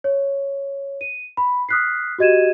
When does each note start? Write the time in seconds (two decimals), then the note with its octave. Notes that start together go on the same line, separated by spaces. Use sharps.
0.04 C#5
1.01 D#7
1.37 B5
1.69 D#6 F6 F#6 B6 C7
2.19 F#4 G4 D#5 G#6 D#7 E7